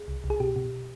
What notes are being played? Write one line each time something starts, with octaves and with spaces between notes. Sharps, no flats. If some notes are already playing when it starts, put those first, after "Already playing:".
Already playing: G#4
C2
C2
G#4
B2 G4
B2